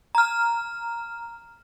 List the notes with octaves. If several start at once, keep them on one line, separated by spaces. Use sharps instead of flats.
A#5 F6